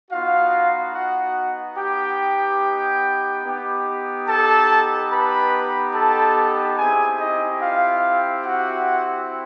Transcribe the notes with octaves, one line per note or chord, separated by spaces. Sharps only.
B3 D#4 F4 F#4 F5
F#4 F#5
G4 G5
B3 D#4 G4
A4 A5
B4 B5
A4 A5
C4 E4 G4 G#4 G#5
D#4 D#5
F4 F5
F#4 F#5